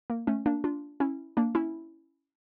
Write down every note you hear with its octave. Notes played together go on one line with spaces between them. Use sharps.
A#3
A3 C#4
A#3 D4
D4 F4
C#4 E4
A#3 D4
C#4 E4